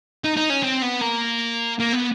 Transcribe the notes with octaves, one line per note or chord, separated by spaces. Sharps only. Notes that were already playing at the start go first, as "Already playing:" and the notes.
D#4
D#4
C#4
C4
B3
A#3
A#3
B3